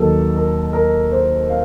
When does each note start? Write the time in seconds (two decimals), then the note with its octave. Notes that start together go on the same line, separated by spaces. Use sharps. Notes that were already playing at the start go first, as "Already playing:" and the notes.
Already playing: D#2 D#3 F#3 A4
0.35 A#4
0.73 A#4
1.12 C5
1.49 F5